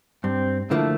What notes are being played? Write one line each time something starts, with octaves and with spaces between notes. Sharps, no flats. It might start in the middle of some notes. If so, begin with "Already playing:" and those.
G2 C4
D3 F3 A3 A#3 E4